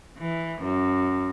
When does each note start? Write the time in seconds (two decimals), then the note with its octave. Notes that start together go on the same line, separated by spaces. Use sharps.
0.18 E3
0.62 F#2